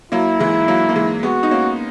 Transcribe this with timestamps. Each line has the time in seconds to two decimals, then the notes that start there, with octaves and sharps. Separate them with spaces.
0.12 F#3 A#3 E4
0.40 E3 G#3
0.68 F#3 A#3
0.89 A#3
0.95 E3 G#3
1.23 G#3 B3 F#4
1.43 D#4
1.51 A#3 C#4